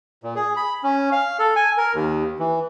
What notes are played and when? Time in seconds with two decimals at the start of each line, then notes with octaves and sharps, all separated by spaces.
0.23 A#2
0.36 G#4
0.56 B5
0.83 C#4
1.12 F5
1.39 A4
1.56 G#5
1.78 A#4
1.94 D#2
2.39 E3